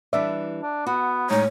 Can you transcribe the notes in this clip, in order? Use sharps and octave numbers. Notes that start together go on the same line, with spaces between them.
E3 G3 D4 D5 E5
D4
B3 F#4
A2 G#3 D#4 C#5